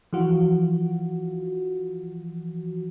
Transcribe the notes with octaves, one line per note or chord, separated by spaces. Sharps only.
E3 F3 F4 F#4